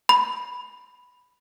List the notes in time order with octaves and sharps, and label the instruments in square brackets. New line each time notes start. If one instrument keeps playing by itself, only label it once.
[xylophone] B5